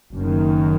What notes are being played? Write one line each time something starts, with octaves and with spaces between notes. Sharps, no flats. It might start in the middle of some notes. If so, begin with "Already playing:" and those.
F#1 F#2 D#3